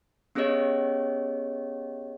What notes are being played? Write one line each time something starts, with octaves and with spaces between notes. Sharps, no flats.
B3 C#4 G4 G#4 C#5 D#5